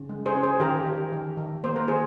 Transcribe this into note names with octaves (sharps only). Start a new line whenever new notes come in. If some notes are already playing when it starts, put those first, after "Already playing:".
Already playing: C#3
G#3
G#4 C5
C#4
G#4 C5
D#3 G4 A#4
D#3
D#3
D#3
A#3 C5
A#4
D#3 G#4 C5